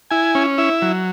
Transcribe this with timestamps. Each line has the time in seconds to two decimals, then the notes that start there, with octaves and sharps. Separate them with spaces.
0.11 E4 G#5
0.35 C#4
0.58 E4 E5
0.82 F#3